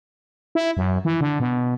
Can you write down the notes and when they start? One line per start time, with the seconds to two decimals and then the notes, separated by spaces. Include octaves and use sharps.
0.55 E4
0.77 F#2
1.05 E3
1.21 D3
1.40 B2